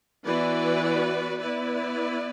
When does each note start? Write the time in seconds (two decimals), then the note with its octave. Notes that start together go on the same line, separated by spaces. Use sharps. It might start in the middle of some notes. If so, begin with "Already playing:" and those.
0.24 E3 B3 F#4 B4 D5
1.40 B3 E4 B4 D5